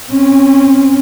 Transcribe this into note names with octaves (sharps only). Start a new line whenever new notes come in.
C4 C#4